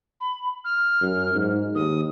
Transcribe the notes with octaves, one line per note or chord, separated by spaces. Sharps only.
B5
F6
F#2
G#2
D#2 D#6